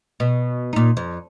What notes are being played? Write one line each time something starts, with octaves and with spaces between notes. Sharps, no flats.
B2
A#2 D#4
F2